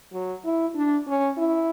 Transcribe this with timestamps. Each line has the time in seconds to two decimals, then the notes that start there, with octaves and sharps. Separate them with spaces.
0.13 F#3
0.45 E4
0.75 D4
1.07 C#4
1.37 E4